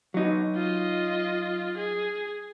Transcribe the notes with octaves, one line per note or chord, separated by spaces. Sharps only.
F#3 D#4
F4 D#5
G#4